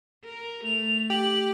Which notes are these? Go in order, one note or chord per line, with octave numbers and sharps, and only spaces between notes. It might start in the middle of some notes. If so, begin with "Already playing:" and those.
A#4
A3 F7
G4 F#7